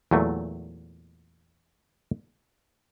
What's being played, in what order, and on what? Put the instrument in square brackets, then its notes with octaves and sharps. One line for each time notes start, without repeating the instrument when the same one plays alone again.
[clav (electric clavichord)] E2 A#2 F#3 A3